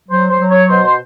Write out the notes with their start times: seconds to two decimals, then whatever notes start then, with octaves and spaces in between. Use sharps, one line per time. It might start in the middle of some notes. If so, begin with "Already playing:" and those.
0.09 F#3 C5
0.30 C5
0.39 F#3
0.50 C#5
0.69 B2 C5
0.84 C5